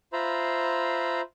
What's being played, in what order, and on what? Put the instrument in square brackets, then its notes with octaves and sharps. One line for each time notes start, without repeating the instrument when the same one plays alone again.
[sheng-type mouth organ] F4 C5 E5 A#5 B5